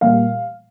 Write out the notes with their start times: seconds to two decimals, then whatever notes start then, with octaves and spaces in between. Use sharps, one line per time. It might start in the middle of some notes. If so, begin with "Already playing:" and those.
0.01 A#2 G3 A#3 F5